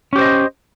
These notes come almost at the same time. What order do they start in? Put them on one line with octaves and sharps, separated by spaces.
C#4 G4 C5 D#5